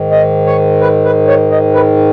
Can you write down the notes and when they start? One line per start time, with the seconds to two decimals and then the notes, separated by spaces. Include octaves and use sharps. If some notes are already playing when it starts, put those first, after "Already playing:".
Already playing: G#2 D#3
0.11 D#5
0.46 C#5
0.81 B4
1.05 B4
1.27 C#5
1.51 D#5
1.74 B4